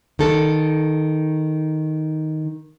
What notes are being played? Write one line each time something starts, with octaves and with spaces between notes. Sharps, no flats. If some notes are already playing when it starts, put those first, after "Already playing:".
D#3 A4